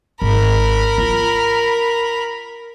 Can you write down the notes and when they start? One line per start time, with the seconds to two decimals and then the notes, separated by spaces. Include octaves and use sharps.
0.22 G#1 A#4 B5
0.98 F4